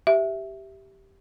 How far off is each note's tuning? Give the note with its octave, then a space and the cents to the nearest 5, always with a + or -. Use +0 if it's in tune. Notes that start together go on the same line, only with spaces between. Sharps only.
G4 -10 E5 +0